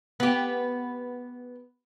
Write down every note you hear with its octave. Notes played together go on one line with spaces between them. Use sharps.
B3 G4